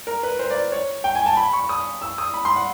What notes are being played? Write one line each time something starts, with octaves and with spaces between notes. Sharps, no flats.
A#4
B4
C5
D5
C#5
G5
G#5
A5
B5
C#6
D#6
E6
D#6
B5
C6
F#5